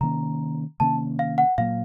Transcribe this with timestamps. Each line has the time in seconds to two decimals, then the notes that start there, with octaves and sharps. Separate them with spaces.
0.01 C3 D#3 A#3 C#4 A#5
0.80 C3 D#3 A#3 C#4 A5
1.19 F5
1.38 F#5
1.58 A#2 F#3 A#3 F5